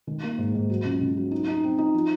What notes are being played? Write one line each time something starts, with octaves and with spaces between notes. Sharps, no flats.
D#3
A#3
G#2
G#2
F#3
C#2
C#2
F#3
D#4
D#4
C4
D#4
F3